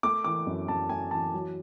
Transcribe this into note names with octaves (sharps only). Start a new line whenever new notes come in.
A3 D6
E3 D6
F#2
F#2 A5
A3 G#5
E3 A5
F#3